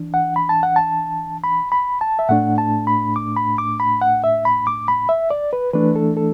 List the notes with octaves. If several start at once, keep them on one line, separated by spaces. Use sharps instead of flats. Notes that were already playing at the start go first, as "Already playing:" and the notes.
Already playing: E3 D4
F#5
B5
A5
F#5
A5
B5
B5
A5
E5
A2 A3 D4 F#5
A5
B5
D6
B5
D6
B5
F#5
E5
B5
D6
B5
E5
D5
B4
E3 A3 D4 B4
A4
A4